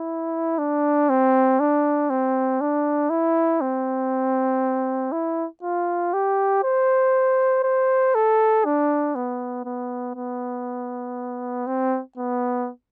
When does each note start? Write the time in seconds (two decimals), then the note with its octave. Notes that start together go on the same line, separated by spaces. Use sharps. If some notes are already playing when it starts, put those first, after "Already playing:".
Already playing: E4
0.59 D4
1.10 C4
1.60 D4
2.10 C4
2.61 D4
3.10 E4
3.61 C4
5.12 E4
5.63 F4
6.13 G4
6.63 C5
7.64 C5
8.15 A4
8.65 D4
9.15 B3
9.65 B3
10.15 B3
11.67 C4
12.17 B3